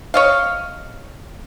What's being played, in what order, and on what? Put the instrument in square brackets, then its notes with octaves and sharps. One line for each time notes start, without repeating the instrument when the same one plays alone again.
[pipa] C#5 D#5 F5